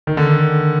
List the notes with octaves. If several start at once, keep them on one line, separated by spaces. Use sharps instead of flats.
D#3
D3